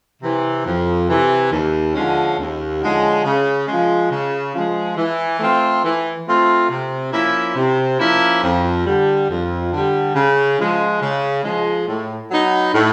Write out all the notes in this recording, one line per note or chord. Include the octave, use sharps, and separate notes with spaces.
C3 E3
F2
C3 E3
D#2
D3 F3 G#3 C#4
D#2
D3 F3 G#3 C#4
C#3
F3 G#3
C#3
F3 G#3
E3
A3 C4 F4
E3
A3 C4 F4
C3
F3 A#3 C#4 E4
C3
F3 A#3 C#4 E4
F2
D3 G3
F2
D3 G3
C#3
F3 G#3
C#3
F3 G#3
A2
F#3 B3 D#4
A2